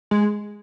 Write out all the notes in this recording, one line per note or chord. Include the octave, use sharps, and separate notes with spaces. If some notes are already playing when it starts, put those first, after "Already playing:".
G#3